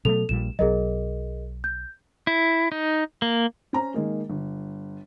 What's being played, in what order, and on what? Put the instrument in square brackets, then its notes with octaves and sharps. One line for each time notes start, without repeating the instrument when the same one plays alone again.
[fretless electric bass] B2 F#3 A3 [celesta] A4 F7
[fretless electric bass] A#1 A#2 G3 [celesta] E7
[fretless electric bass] B1 F#3 [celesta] G#4 A#4 D#5
[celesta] G6
[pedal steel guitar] E4
D#4
A#3
[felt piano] C#4 C5 A#5
D#3 G#3 A#3
G1